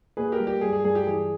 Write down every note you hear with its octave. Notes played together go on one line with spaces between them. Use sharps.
A#2 G#4 B4
G4 A#4
G3
G4
G2 G#4
G#4
G2 G#4
G4
E3 G#4